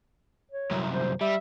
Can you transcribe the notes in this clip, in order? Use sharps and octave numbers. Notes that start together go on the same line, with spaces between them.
C#5
C2 F#2
C5
G3 E5